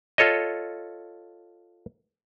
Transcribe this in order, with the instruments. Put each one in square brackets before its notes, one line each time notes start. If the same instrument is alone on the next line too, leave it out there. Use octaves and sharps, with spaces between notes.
[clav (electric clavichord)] F4 A4 C#5 D#5